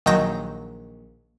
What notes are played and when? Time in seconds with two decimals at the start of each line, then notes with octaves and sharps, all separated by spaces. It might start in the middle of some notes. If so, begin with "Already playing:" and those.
0.06 A#1 D#3 F#3 G6 A#6